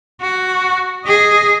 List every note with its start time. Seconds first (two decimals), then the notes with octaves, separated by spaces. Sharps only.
0.21 F#4
1.05 G#4 D#5